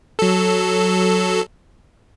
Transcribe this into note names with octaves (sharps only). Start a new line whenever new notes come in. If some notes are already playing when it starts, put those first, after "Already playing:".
F#3 A4